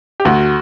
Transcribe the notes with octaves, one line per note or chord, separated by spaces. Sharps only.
G4
D2 F#4